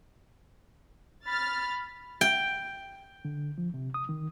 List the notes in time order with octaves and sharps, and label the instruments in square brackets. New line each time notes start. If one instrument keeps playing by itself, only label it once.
[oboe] B5 [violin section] F6 A6
[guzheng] G5
[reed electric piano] D3
F3
C3
D#6
D#3